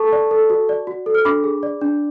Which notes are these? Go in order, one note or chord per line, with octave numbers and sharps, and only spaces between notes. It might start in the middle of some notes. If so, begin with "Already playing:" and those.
Already playing: A4 A5 C#6
D5
A4
F#4
D5
F#4
A4
F6
D4 B5 D6
G#4
D5
D4